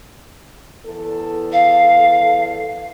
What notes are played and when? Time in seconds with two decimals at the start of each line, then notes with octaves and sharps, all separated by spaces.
0.85 E2 A4
1.53 F5